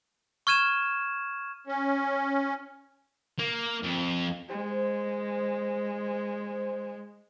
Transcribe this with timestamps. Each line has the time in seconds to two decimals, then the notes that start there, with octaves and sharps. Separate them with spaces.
0.47 C#6 F6 G#6 D#7 E7
1.67 C#4
3.39 A#3
3.83 F2
4.49 G#3 C5